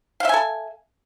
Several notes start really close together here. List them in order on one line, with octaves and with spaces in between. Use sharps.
F5 E5 G#5 A4